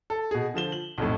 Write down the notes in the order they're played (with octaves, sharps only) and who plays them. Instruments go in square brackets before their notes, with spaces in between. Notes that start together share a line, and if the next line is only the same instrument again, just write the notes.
[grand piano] A4
B2 G#4
D3 F3 E7 G7
F#7
B1 F2 A2